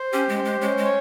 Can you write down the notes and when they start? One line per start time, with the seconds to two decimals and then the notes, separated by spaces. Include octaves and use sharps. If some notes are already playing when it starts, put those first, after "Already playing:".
Already playing: C5
0.13 C#4 G4
0.29 G#3
0.37 C5
0.45 G#3
0.61 G#3 C#4
0.78 G#3
0.85 C#5